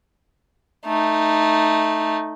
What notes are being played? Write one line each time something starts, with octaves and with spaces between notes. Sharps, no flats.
A3 D#4